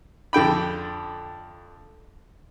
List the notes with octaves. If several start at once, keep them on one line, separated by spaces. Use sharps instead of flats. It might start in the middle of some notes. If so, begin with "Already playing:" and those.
F2 D3 G5 B5